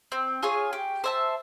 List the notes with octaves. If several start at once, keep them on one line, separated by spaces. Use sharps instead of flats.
C4
F4 G#4 C#5
G4
C5 E5 A5